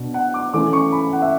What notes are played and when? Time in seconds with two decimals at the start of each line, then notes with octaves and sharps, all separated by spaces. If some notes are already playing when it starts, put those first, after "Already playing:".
Already playing: B2 D4
0.14 F#5
0.34 D6
0.54 E3 A3 C#4 D6
0.73 C#6
0.92 B5
1.13 F#5
1.22 E5